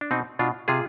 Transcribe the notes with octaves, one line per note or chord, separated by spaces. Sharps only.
D4
B2 C4 D#4
B2 D4 F4
C3 F4 G#4